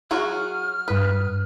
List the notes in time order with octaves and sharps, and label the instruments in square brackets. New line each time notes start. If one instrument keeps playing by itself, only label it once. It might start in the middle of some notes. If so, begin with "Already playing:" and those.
[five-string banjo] F#3 F#4 G#4 [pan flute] F6
[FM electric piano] G2 D#6 [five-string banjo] B4